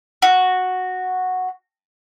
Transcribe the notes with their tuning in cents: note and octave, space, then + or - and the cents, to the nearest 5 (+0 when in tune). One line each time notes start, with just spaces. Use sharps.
F#4 -5